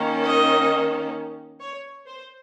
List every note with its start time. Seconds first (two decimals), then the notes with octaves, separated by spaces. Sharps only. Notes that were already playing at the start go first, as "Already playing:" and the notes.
Already playing: D#3 A#3 C#4
0.26 D#5
1.61 C#5
2.07 C5